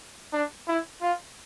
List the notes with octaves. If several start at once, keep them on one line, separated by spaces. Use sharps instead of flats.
D4
E4
F4